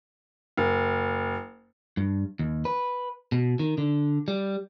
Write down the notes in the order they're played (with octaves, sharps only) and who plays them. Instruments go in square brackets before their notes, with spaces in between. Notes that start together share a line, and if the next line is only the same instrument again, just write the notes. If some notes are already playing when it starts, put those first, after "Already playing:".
[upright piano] F#1
[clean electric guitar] G2
D#2
B4
B2
D#3
D3
G3